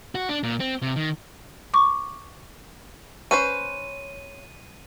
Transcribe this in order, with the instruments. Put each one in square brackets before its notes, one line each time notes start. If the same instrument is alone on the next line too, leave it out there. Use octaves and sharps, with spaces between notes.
[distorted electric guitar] F#4
D4
A#2
C4
C3
D#3
[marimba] C#6 D6
[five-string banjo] C#4 B4 C5 [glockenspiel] D#7